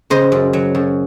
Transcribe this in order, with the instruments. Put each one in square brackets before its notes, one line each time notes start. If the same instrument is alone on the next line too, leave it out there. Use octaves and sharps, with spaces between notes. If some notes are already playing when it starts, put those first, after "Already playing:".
[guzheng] C#3 C5 D#5
F#2
F#3
F#2